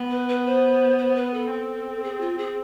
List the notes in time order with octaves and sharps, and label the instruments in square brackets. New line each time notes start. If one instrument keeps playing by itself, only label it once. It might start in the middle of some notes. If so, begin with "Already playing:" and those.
Already playing: [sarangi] B3
[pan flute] B4
B4
C5
C5
B4
A4
[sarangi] C4
[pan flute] G#4
F4
G#4